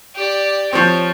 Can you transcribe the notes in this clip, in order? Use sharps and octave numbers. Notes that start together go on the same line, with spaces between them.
G4 D5
F3 C4 C#5